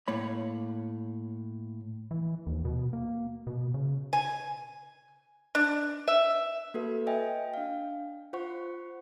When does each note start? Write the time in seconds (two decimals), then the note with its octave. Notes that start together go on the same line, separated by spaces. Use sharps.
0.08 A2 A#3 C#5 B5
2.11 E3
2.47 D#2
2.65 B2
2.93 A#3
3.47 B2
3.74 C#3
4.13 G#5
5.55 D4
6.08 E5
6.74 A#3 F#4 A4 B4
7.07 D#5 E5 G5 G#5
7.54 D4 F5
8.33 F4 C5 F#5 C#6